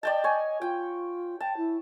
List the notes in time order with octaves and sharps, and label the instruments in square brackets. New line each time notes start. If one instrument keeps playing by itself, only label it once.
[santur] D5 G5 A5 [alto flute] D#5
[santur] C#5 G#5
[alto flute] F4 [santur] G5
[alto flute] G5 [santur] A5
[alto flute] E4